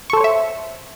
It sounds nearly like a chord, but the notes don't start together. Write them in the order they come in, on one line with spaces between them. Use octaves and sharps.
C#6 A4 C5 C#5 E5